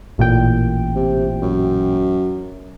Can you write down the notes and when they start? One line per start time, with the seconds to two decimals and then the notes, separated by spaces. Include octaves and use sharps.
0.18 A1 A#2 G5
0.96 C3
1.42 F#2